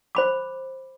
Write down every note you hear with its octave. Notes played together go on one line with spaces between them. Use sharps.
C5 B5 D6